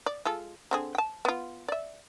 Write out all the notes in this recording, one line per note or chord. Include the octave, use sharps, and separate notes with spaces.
D5
G#3 F4 A4
D3 C4 G#4
G5 A5
B3 F4
D5 E5